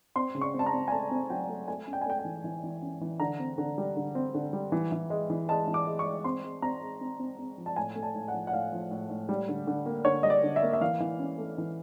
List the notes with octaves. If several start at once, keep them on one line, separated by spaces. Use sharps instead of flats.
C4 C6
C#3
C#6
C4
A5
A#5
C4
G#5
A3 A5
C4
F#3 G5
A3
A3 G#5
C#4
G5
G#5
A3 G5
G5
E3
E3
E3
C#4
E3
D3 A#5
C4
D3
G3
D3
C4
D3
G3
E3
E3
G#3
E3
G#3 A5
E3
D6
G#3
C#6
G#3
C4 C6
G#3
C4 A#5
G#3
C4
C4
C4
F3
A5
A2 G#5
A3
A5
A2
F#5
F3
F#5
A2 F5
F3
A2
A2
G3
D3
D3
A#3
D3 C#5
G3 D#5
D5
D3
E5
A#3
E5
E3 F5
E3
C#4
A3
E3